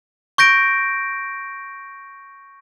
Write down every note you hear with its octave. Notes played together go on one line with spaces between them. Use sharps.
C#6 G6 A#6 D7